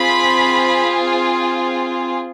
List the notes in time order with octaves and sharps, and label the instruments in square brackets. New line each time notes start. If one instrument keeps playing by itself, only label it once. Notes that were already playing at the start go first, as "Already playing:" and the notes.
Already playing: [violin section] C4 F4 G#4 B5